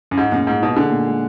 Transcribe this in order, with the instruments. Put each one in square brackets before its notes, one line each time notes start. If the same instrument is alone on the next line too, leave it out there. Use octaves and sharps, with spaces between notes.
[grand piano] F#2
[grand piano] G#2 [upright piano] G#4
[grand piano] F#2 [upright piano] A#2
[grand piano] G#2 [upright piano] G#3
[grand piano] B2 [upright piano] D#4
[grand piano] D3 [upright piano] G#4
[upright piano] A#2
G#3